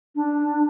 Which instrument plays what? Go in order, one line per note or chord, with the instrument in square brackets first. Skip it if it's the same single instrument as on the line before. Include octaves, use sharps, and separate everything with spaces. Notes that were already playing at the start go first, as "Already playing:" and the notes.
[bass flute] D4